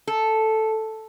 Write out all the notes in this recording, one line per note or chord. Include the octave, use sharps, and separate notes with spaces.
A4